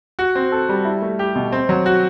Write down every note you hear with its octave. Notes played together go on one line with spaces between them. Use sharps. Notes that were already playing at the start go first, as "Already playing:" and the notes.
F#4
C4
A4
G3
E4
A3
G4
B2
C4
F#3
F#4